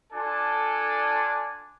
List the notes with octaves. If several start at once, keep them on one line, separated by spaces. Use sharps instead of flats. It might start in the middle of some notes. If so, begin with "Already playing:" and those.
D4 F4 A4 D5 G#5